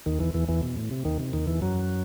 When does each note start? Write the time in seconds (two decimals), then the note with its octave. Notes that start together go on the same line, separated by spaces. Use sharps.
0.06 D#2 D#3
0.20 E2 E3
0.34 E2 E3
0.49 E2 E3
0.63 B2
0.77 A2
0.91 C3
1.05 D#2 D#3
1.19 C3
1.33 D#2 D#3
1.47 E2 E3
1.62 F#2 F#3